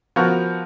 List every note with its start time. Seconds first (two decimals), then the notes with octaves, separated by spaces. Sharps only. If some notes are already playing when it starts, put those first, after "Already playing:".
0.16 F3 B3 F#4 A#4